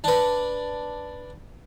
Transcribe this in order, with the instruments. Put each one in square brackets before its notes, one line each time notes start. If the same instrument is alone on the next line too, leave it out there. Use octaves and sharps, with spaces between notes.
[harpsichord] D4 B4